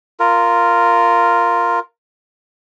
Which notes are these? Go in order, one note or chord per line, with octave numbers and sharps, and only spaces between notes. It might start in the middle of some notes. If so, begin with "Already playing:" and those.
F4 A#4